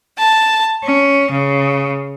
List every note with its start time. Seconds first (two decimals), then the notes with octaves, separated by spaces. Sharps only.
0.17 A5
0.84 C#4
1.30 C#3